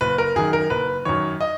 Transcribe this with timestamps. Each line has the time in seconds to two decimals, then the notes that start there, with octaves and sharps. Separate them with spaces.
0.01 F#1 B4
0.18 A#4
0.36 F#2 D#3 G#4
0.53 A#4
0.70 F#1 B4
1.05 F#2 D#3 C#5
1.41 D#5